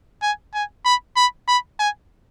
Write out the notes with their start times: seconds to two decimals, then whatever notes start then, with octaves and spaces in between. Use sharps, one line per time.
0.22 G#5
0.54 G#5
0.85 B5
1.17 B5
1.48 B5
1.80 G#5